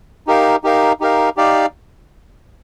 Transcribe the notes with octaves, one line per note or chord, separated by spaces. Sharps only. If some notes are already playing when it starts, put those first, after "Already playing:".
D#4 G4 A#4 F5
D#4 G4 A#4 F5
D#4 G4 A#4 F5
D#4 G4 D5 F5